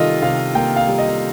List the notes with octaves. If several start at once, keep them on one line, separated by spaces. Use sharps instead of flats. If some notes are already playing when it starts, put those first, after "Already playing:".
Already playing: C3 D#3 G3 F4 A4 D#5
C3 F5
A#3 G5
F5
G3
D#5